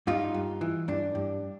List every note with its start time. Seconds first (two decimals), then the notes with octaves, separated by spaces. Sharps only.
0.07 G2 D#4 F4
0.34 G2
0.61 E3
0.88 G2 D4
1.15 G2